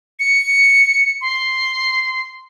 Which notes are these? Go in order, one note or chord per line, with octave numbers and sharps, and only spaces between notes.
C#7
C6